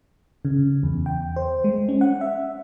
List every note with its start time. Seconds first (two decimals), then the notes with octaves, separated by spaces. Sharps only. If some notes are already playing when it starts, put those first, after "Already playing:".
0.45 C#3
0.83 E2
1.06 G5
1.36 C5
1.64 G#3
1.89 C#4
2.01 F#5
2.21 E5